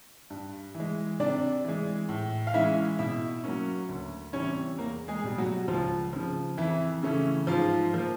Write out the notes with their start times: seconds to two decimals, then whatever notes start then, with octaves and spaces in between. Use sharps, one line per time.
0.30 G2
0.75 E3
0.80 G#3
1.20 C3 D4 D5
1.65 E3 G#3
2.09 A2
2.47 F5
2.54 E3 G#3 C#4 E4 E5
2.99 B2 E4 E5
3.44 F#3 A#3 C#4
3.89 D2
4.33 C3 E3 G3 C#4 C#5
4.78 E2 A#3 A#4
5.08 G#3 G#4
5.24 B2 G3
5.38 F#3 F#4
5.68 C#2 F3 F4
6.13 C#3 F3
6.57 F2 E3 E4
7.03 C#3 E3 A3 C#4
7.47 G#2 F3 F4
7.93 F3 A#3